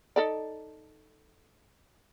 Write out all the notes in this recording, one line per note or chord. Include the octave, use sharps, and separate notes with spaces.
D#4 A4 D5